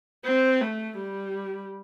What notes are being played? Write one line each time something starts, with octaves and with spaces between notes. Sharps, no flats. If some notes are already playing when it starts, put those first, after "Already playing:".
C4
A3
G3